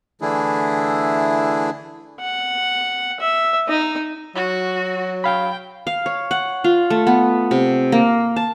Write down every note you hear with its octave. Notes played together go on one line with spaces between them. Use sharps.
D3 E3 A3 D4 E4 G#4
F#5
E5
D#4 D#5
F#3 F#4
F5 G5 B5
F5
C#5
F#5
F4
A3
B3
C3
A#3
A5